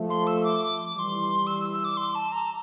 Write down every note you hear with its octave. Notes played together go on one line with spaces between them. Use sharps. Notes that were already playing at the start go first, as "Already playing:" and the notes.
Already playing: F3 A3
C6
E6
D6
E3 G3 C6 D6
E6
E6
E6
D6
C6
A5
A#5